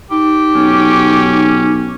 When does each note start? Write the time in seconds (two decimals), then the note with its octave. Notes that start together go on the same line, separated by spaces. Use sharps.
0.11 D#4 G4
0.55 B1 C#4